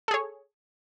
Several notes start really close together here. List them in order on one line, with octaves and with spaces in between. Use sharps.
A4 G#4 C#5